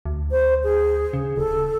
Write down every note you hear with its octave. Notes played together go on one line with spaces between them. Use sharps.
D2
C5
G#4
C#3
D1 A4